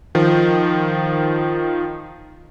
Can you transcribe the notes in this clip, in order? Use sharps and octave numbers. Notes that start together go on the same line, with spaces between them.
D#3 F3